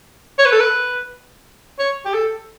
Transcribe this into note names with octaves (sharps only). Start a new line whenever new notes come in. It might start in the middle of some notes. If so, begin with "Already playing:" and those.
C#5
B4
A4
B4
C#5
G4
A4